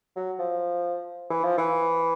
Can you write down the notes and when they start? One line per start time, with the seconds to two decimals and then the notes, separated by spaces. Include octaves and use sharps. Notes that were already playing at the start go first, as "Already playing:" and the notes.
0.16 F#3
0.39 F3
1.30 E3
1.44 F3
1.58 E3